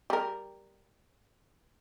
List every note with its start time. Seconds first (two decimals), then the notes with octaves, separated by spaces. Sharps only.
0.10 G3 A#4